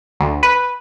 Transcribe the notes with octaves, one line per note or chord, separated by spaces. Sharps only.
D2
B4